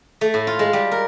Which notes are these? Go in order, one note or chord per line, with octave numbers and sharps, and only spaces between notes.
A3
A2
F4
G#3
G3
A#4